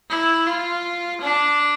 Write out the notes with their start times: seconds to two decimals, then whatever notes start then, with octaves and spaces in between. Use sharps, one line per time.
0.10 E4
0.46 F4
1.21 D4